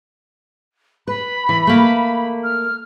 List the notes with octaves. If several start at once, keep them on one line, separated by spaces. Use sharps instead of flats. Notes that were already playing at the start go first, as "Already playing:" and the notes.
B4 B5
E3
A3 A#3
F6